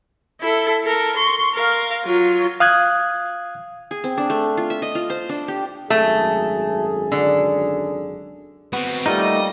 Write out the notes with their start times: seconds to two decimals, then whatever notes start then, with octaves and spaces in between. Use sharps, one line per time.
0.41 E4 A4
0.84 A4 A#4
1.16 C6 C#6
1.54 A#4 F5
2.04 F#3 F4
2.60 F5 D#6 F#6 G#6
3.91 G#4
4.04 C4
4.18 D4
4.30 A3
4.57 F4
4.70 E5
4.82 D#5
4.95 F4
5.10 C5
5.29 D4
5.48 G4
5.90 G#1 F#2 A3 G#4
7.12 D3
8.73 B3 C4 F#4
9.06 G3 A3 A#3 D#4 F4 D#5